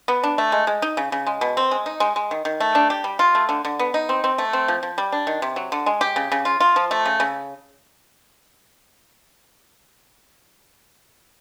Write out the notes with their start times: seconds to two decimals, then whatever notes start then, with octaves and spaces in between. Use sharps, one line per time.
0.08 B3
0.23 D4
0.38 A3
0.52 G#3
0.67 G#3
0.82 D#4
0.97 C#3
1.12 C#3
1.27 G#3
1.41 B2
1.57 C4
1.71 G#3
1.86 D#4
2.00 G#3
2.16 G#3
2.31 D#3
2.45 D#3
2.60 A3
2.75 D4
2.90 G4
3.04 G3
3.19 F4
3.35 A3
3.49 D3
3.65 D3
3.79 B3
3.94 D#4
4.09 C4
4.24 C4
4.38 A3
4.53 C4
4.68 F3
4.83 F3
4.98 G3
5.12 D4
5.27 D#3
5.42 C3
5.56 F#3
5.72 D3
5.86 G#3
6.01 G4
6.16 C#3
6.32 C#3
6.45 F4
6.60 F4
6.76 F3
6.91 A3
7.06 C#3
7.20 C#3